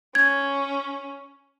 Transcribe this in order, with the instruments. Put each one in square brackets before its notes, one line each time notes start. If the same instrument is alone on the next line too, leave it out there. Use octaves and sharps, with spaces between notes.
[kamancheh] C#4 [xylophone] G#6